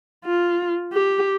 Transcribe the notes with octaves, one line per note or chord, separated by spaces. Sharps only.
F4
G4